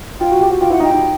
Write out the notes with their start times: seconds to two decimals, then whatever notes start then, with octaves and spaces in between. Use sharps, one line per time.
0.20 F4 G5
0.31 F#4
0.41 G4
0.50 F#4
0.61 F4 G5
0.70 E4 F#5
0.80 D#4
0.84 G5
0.91 D#4